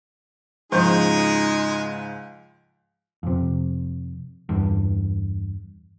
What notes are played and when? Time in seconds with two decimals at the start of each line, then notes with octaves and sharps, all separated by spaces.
0.72 C#2 G#2 F3 G#3 D#4 G#4 C#6 G6
3.23 F2 C3
4.49 E2 G2